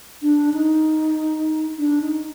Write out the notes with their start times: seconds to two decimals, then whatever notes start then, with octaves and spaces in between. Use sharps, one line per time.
0.22 D4
0.54 D#4
1.78 D4
2.01 D#4